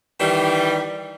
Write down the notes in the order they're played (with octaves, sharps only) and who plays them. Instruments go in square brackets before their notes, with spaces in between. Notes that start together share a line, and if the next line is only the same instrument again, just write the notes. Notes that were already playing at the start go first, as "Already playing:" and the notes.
[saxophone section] D#3 E3 G3